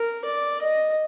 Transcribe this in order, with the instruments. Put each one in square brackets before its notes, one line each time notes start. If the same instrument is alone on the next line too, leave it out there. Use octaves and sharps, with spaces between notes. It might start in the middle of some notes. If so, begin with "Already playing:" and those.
Already playing: [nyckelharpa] A#4
D5
D#5